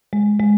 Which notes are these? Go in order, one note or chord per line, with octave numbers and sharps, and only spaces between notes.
G#3
G#3